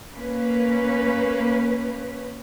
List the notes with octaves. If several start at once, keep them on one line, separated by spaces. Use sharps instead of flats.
A#3 C#4 B4